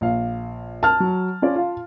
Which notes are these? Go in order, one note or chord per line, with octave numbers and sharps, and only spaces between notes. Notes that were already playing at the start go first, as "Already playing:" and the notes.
A#1 F5
A5 F6
F#3
C#4 F4 D5
F4 F5